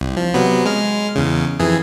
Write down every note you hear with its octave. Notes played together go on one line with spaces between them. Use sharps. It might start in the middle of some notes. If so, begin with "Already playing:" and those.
C2
F3
C3 F#3 B3
G#3 F6
E2 C#3
F2 E3 G#4